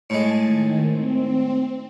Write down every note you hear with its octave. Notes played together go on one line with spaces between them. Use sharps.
A2 G#3 G#5 A5
D#3
C4